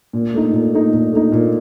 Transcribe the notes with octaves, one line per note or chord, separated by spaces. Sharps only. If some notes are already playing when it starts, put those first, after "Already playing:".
A#2
A3 D#4
A#2
A3 D#4
A#2
A3 D#4
A#2